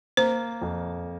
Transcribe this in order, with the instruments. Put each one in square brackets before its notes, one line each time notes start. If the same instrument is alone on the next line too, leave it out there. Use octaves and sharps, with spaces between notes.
[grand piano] A#3 [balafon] C5
[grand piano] F2